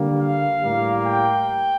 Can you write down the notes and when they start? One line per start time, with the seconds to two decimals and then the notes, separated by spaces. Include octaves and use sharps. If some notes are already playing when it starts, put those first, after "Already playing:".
Already playing: D3 G3 A#3
0.18 F5
0.62 A2 G3 A#3
1.06 G5